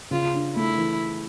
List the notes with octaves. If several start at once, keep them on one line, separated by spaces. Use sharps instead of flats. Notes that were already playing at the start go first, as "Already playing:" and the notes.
C#3 F4
D4
A3 E4
E3